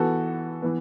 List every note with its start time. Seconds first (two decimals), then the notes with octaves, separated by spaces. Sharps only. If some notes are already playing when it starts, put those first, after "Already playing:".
Already playing: E3 B3 F#4 A4
0.62 E3 B3